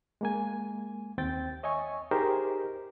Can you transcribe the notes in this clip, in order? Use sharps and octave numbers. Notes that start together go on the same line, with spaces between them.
G#3 A#3 G#5
D#2 C4 G5 A6
C#5 D#5 E5 G#5 C#6
D#4 G4 G#4 A#4 C5